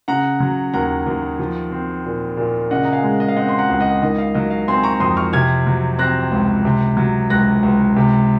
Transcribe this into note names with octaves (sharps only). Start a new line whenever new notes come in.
C#3 F#5 A#5
F#3
D#2 F#5 A#5
D#2
F3
C4
A#2
A#2
C#3 D#5 F#5
A#5
F5 G#5
G#3
D#5
F5
C4 D#5 F#5
C6
F#5 A#5
C#2
D#5 F#5
D#3 D#5
F5
F#3 D#5
F5
C4 G#5 C6
A#5 C#6
F2 C6 D#6
C#6 F6
C3 F6 G#6
F#3
C4 F#6 A#6
C#2
C3
F#3
C#2 F#6 A#6
C#2
C3